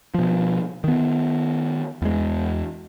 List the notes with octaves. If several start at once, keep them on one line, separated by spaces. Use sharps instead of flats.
B2 F3
D#3 B3
E2 G#3